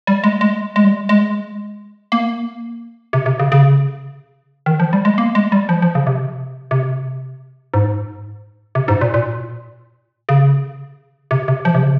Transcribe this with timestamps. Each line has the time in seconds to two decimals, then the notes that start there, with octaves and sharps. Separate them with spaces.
0.07 G3
0.24 G#3
0.41 G#3
0.76 G#3
0.84 G3
1.09 G#3
2.12 A#3
3.13 C3
3.26 C3
3.39 C#3
3.52 C#3
4.66 D#3
4.80 F3
4.93 G3
5.05 G#3
5.18 A#3
5.35 G#3
5.52 G3
5.69 F3
5.82 F3
5.95 C#3
6.07 C3
6.71 C3
7.74 G#2
8.75 C3
8.88 G#2
9.01 A#2
9.14 A#2
10.29 C#3
11.31 C3
11.48 C3
11.65 F3
11.75 C3
11.82 C#3